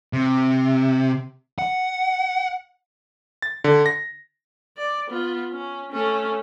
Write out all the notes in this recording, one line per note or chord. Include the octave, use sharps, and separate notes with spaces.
C3
F#5
A6
D3
A#6
D5
B3 F4
C#4
A3 C#4